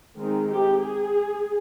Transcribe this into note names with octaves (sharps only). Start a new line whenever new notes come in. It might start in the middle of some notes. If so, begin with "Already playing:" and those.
D#3 G#3 C4 D#4
G4
G#4